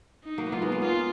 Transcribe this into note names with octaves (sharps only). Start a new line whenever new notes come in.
D#4
F#3 A#3
B3
F#3 A#3 F4
G#3 B3
A#3 C#4
B3 D#4 F4